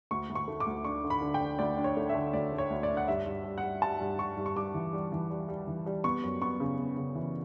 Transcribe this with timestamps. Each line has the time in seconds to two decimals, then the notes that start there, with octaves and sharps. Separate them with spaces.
0.11 D2 C#6
0.30 D2
0.35 C#6
0.48 A3
0.60 D6
0.67 D2
0.84 D4 C#6
1.04 D3
1.10 B5
1.22 D3
1.34 G5
1.41 D4
1.59 D2 D5
1.77 D4
1.84 C#5
1.97 A3
2.09 E5
2.15 D3
2.33 D2 D5
2.52 A3
2.58 C#5
2.70 D2
2.83 D5
2.90 D4
2.97 F#5
3.08 G2 E5
3.26 G2
3.44 G3
3.58 F#5
3.63 G3
3.82 G3 A5
4.01 G2
4.19 G3 C#6
4.37 G2
4.46 C#6
4.56 G2 D6
4.74 E3
4.93 G3
5.12 E3
5.31 G3
5.49 G3
5.67 E3
5.86 G3
6.04 B3 C#6
6.24 F#2
6.41 B3 C#6
6.60 C#3
6.78 B3
6.97 C#3
7.15 E3